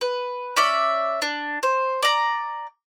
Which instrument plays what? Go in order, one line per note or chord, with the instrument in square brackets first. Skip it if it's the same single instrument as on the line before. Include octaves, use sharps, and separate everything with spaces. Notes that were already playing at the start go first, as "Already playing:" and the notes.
[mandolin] B4
C#4 D5 E5
D4
C5
D5 A#5